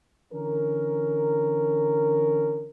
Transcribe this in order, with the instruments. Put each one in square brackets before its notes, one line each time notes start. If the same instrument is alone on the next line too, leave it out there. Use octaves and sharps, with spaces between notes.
[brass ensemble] D3 E3 C#4 A#4